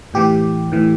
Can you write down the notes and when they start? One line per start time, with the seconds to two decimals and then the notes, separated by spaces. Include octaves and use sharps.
0.14 A2 E3 G4
0.72 A2 E3